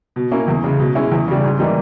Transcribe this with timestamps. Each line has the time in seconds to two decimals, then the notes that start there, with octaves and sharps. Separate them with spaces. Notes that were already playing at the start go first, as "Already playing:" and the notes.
0.16 B2
0.31 A#3 C#4 E4
0.48 E2
0.64 C#3 G#3
0.79 B2
0.95 G#3 C#4 E4
1.12 E2
1.28 C#3 G3
1.44 G#2
1.59 E3 G3 A#3 D#4